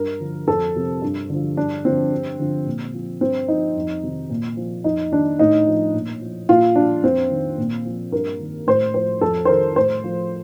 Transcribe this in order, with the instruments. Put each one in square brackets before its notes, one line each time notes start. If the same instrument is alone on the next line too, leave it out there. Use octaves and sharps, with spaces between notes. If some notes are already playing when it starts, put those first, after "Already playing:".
Already playing: [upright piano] G2 A#4
D3 F3
F2 A4
C3 F3
G2
D3 F3
G2 D4
D3 F3 C4
G2
D3 F3
A#2
F3
G2 C4
F3 D#4
F2
C3 D#3
A#2
F3
F2 D#4
D#3 D4
A2 D#4
F3
A#2
F3
A#2 F4
F3 D4
F2 C4
D#3
A#2
F3
G2 A#4
D#3
A2 C5
F3 C5
F2 A4
C5
D#3 A#4
A2 C5
F3